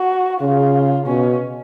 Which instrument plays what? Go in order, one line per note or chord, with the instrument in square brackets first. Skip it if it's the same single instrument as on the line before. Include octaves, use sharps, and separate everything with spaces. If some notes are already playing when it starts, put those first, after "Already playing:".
Already playing: [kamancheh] F#4
[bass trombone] C#3 [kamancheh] F4
[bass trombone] B2 [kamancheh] C#4